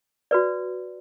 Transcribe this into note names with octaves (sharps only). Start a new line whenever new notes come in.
F#4 B4 D5